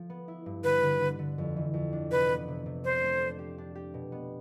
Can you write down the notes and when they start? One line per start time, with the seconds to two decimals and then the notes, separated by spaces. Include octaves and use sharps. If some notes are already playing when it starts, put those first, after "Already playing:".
Already playing: F3 A3
0.10 B3
0.28 E4
0.46 G2
0.64 D3 B4
0.83 D3
1.00 D3
1.19 D3
1.38 F2
1.56 E3
1.74 F2
1.93 D4
2.11 C3 B4
2.29 B3
2.48 C3
2.66 C3
2.84 D4 C5
3.03 A3
3.20 D4
3.39 G4
3.58 D4
3.75 G4
3.94 B2
4.12 B3